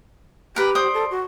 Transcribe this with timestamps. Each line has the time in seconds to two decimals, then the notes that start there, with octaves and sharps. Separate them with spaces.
0.56 G4 A#4 B4
0.75 C5 D5 D#6
0.94 A4
1.11 F#4